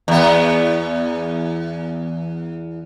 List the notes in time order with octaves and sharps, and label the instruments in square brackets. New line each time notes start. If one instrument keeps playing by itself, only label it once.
[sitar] E2 B3